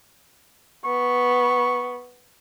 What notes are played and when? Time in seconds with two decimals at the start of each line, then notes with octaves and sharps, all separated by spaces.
0.85 B3 C#6